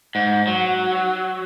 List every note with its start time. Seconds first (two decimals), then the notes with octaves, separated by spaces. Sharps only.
0.15 G#2
0.47 F#3